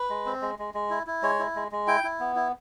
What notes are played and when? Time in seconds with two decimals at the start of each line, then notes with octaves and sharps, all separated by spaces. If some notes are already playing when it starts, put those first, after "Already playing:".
Already playing: B4
0.10 G#3
0.26 C4
0.42 G#3
0.59 G#3
0.74 G#3
0.90 E4
1.07 E4
1.23 G#3 C#5
1.39 E4
1.55 G#3
1.72 G#3
1.88 E4 G5
2.04 E4
2.20 B3
2.36 E4